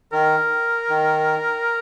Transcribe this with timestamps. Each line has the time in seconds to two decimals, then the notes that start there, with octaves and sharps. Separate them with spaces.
0.12 D#3 A#4
0.89 D#3